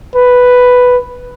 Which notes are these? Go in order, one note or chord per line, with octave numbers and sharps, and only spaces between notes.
B4